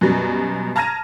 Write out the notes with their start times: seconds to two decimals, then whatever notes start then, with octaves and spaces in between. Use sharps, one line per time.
0.01 F#2 B2 G3
0.76 A5 A#5 F6 G#6 A#6 D#7